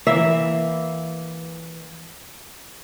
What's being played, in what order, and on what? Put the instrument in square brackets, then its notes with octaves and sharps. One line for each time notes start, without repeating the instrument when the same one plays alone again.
[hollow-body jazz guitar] E3 A#3 [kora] E5